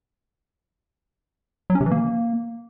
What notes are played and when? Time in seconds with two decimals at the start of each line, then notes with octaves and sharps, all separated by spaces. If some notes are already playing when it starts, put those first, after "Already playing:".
1.70 F#3
1.75 C#4
1.81 C3
1.86 E3
1.91 A#3